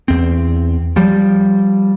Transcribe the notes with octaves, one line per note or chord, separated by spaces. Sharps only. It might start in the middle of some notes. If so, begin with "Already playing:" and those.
E2 C4
F3 G3